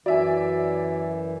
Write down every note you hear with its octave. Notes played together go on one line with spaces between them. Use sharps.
F#2 E3 F#4 D5 E5 G#5